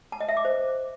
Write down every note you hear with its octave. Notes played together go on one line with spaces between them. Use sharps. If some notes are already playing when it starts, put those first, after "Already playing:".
A5
D#5
E5
D6
C5